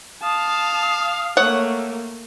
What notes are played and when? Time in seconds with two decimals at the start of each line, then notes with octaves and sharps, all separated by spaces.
0.23 F5 A5 D#6
1.37 A3 A#3 C#5 F#5